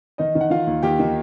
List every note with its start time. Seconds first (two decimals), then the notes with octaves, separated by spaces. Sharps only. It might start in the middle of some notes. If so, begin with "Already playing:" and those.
0.18 D#3 D#4 D#5
0.35 D#3
0.41 F#5
0.50 D#3 F4 F5
0.67 D#2
0.83 D#2 G4 G5
0.99 D#3